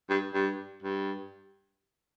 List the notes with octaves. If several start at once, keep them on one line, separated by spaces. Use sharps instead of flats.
G2
G2
G2